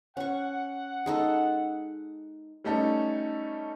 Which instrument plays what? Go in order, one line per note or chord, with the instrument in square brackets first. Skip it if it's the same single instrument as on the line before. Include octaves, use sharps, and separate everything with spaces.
[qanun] C#4 C#6 [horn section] F#5
[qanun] G#3 D#4 A4
[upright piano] G3 A3 C#4 D#4 A4